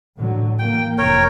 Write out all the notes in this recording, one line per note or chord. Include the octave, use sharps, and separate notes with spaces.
A2 D3 F#3
E3 A#3 G5
F1 A#4 C#5 G5